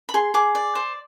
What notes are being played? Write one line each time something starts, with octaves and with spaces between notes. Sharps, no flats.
B5
G#4 C6
G#4 D6
D5
C5